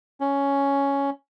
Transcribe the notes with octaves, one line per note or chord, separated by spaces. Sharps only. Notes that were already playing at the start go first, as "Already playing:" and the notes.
C#4